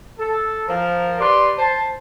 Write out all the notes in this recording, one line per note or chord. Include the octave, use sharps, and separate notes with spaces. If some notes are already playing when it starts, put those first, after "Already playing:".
A4
F3 A#4
G4 B4 D5 C6
C5 A5